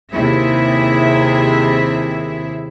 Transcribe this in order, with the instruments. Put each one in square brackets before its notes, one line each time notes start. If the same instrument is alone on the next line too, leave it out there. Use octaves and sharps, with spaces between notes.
[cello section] D#2 C3 E4 G#4 E5